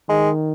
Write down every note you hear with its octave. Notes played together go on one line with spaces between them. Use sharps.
D#3 G#3